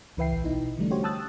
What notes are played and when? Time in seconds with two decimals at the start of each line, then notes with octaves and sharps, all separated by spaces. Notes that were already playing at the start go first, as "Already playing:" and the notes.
0.17 C#2 E3 B4 E5 G5 C7
0.33 A#1
0.44 B2 D#4 E4
0.78 D3 E3 G3 A3 D4
0.90 C#4 F#4 G4 C5 C#5
1.03 G5 A5 D#6 E6 F#6 A6